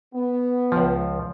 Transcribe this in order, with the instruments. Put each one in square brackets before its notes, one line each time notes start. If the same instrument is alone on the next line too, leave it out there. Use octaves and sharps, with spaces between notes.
[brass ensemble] B3
[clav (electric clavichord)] C#2 F3